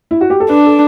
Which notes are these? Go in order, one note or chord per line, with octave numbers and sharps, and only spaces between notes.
E4
F#4
G4
A4
D4 B4
A4